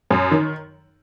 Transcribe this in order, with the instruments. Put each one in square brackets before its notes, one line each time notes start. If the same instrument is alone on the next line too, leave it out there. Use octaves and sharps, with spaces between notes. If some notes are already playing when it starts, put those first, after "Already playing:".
[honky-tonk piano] F#2
D#3